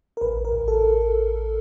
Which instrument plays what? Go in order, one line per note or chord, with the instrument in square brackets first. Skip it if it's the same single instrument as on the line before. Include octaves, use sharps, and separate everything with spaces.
[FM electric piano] A#4
A1 B4
A#4
A1
A4